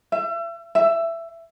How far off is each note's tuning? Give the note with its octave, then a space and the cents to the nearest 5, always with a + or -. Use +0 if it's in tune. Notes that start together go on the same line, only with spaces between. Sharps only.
E5 +35
E5 +15